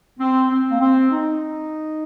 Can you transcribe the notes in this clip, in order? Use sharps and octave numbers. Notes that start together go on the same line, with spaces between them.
C4
C4
A#3
C4
D#4